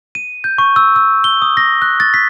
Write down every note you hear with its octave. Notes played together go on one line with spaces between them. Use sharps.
D#7
G6
C#6
E6
E6
G7
D#6
A#6
F#6
A6
B6